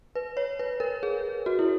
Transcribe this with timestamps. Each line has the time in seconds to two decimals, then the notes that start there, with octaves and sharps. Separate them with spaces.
0.16 B4
0.37 C#5
0.59 B4
0.80 A#4
1.03 G#4
1.46 F#4
1.59 E4